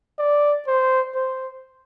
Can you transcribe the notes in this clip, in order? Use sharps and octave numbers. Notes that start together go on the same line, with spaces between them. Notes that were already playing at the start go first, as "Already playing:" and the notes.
D5
C5
C5